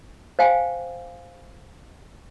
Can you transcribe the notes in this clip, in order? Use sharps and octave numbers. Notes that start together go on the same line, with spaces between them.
C5 F5 G5 G#5